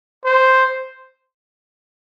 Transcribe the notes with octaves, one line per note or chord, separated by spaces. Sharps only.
C5